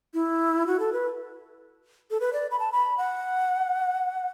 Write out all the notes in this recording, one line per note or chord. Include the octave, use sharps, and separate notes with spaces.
E4
F#4
A4
B4
A4
B4
D5
B5
A5
B5
F#5